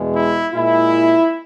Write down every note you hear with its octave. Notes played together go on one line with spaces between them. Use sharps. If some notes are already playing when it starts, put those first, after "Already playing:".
Already playing: E2 B2 G#3
E4
A#2 G#3 E4